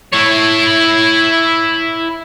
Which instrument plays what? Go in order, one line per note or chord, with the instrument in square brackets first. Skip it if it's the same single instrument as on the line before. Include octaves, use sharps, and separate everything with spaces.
[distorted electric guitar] E4 C#5